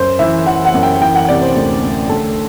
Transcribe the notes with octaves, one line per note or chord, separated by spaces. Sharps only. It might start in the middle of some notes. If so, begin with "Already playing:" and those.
Already playing: F#2 C5
E3 E5
E3 F#5
F#5
F#2
G5
E3 G5
F#5
C3 D5
C5
D2
D2
D2 A4